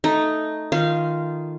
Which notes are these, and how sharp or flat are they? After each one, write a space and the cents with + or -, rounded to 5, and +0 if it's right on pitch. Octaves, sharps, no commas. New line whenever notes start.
A3 +0 D#4 +0
D#3 +0 F4 -10 F5 -20